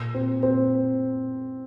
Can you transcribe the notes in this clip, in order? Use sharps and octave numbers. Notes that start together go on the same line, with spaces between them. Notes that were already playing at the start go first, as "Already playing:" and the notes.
Already playing: A#2
C4
C4